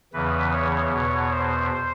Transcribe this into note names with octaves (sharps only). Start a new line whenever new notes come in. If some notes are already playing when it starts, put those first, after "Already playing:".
E2 C#3 E3 B4
C#5
E2 B2 C#5
C5